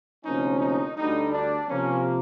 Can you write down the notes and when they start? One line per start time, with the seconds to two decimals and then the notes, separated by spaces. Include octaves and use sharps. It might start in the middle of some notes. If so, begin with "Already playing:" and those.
0.25 D2 C3 F3 A#3 C#4 D#4
0.60 D#4
0.97 D2 D3 G3 D#4
1.32 D4
1.69 C3 F3 A#3 C#4